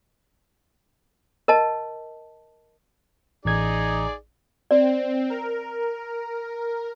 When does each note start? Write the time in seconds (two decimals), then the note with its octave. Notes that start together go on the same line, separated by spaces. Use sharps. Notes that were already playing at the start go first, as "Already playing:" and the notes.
1.48 A#4 D#5 A5
3.45 A1 D#4 G#4 D5 G#6
4.71 C4 D5
5.30 A#4